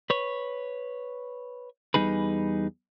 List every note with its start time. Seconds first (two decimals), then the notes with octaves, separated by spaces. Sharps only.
0.10 B4 C#5
1.94 E2 A#2 G3 D#4 G#4 B4